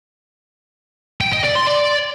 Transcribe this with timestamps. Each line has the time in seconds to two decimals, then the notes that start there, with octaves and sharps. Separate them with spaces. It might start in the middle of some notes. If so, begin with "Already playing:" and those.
1.21 G5
1.32 D#5
1.44 D5
1.55 C6
1.67 D5